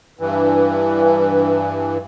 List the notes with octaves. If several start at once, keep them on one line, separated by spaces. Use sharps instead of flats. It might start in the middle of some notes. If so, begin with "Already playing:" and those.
G2 E3